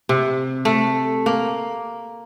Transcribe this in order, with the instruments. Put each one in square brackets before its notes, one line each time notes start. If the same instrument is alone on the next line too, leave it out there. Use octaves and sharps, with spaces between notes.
[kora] C3
A3
A#3